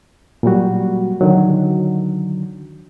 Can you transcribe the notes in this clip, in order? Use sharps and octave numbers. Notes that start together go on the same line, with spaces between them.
A#2 F#3 G3 F#4
D3 D#3 F#3